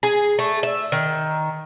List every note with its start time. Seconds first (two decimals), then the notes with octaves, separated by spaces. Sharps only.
0.03 G#4
0.39 A3
0.63 E5
0.92 D#3